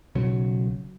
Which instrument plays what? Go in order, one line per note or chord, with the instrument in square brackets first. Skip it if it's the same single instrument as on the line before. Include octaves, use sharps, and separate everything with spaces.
[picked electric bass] B1 C#3 F#3